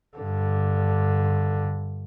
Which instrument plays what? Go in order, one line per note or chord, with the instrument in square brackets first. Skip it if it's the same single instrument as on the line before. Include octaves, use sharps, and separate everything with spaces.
[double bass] G2 D3